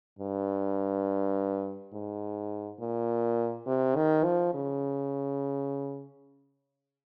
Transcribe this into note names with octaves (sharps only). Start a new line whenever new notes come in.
G2
G#2
A#2
C3
D#3
F3
C#3